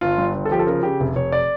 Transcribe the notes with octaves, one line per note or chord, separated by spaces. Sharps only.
G1 F4
G2
G1
A4
F3 G4
A4
C#3 A#4
C#3 G4
F1
F1 C#5
D5